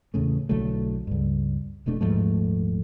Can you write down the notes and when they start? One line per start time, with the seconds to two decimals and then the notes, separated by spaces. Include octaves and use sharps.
0.14 E2 A2 C#3 A3
0.49 B1 D3 F#3 A3
1.07 C#2 G2
1.86 F1 B2 A3 D4
2.01 D#1 G#2 F3 A3